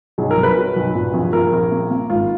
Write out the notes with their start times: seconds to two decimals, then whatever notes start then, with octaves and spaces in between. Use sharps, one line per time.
0.18 B1 G#4
0.31 A#4
0.37 B1
0.43 B4
0.56 F#3
0.76 B1
0.95 A#2
1.13 A#1
1.33 A#1 A#4
1.52 A#1
1.71 A#3
1.91 A#3
2.10 G#1 F4